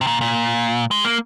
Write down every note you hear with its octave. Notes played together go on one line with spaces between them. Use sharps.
C3
A#2
A#2
G#3
A#3